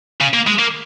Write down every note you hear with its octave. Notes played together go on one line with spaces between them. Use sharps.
C#3
A#3
G#3
A#3